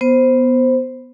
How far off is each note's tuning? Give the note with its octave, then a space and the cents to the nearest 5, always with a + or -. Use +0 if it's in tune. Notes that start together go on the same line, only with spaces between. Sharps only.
B3 +0 C5 +0